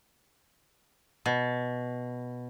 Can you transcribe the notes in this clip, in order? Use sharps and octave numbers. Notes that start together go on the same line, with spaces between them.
B2